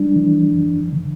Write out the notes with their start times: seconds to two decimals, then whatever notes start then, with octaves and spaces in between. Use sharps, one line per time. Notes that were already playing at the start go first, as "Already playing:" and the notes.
Already playing: G3 D4
0.16 E3
0.54 F#2
0.93 D3